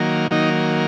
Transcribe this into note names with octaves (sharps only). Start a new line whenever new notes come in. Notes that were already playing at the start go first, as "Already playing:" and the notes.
Already playing: D#3 F#3 A#3
D#3 F#3 A#3 D#4